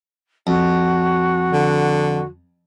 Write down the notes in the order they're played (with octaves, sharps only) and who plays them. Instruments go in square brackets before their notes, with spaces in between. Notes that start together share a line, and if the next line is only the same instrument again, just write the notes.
[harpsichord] F2 [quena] F#4
[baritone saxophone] D3